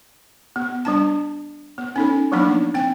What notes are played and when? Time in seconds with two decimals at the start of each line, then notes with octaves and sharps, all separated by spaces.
0.56 B3
0.85 G3 D4 A5
1.78 B3
1.96 C#4 D#4 A4
2.32 F3 F#3 A#3 B3 D4 D#4
2.74 C4 G5